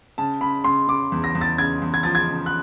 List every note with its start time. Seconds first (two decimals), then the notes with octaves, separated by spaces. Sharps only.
0.18 C#3 A5
0.41 C#3 B5
0.64 C#3 C6
0.88 C#3 D6
1.12 E2
1.24 A#6
1.35 E2
1.41 A6
1.58 C#3 G#6
1.82 E2
1.94 G#6
2.03 F3 A6
2.15 G#6
2.28 C#3
2.46 F#6